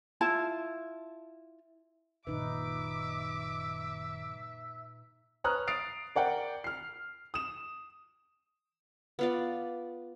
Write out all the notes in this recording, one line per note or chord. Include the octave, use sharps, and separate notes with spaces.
E4 F4 A5
F#1 A#2 D#3 D#4 B4 E5 D6
B4 C#5 A#5 D#6 F6 F#6
D#6 A6 C7 D7 F7
A#4 D5 F#5 G5
F6 C7
D#6 E7
B3 F4 D5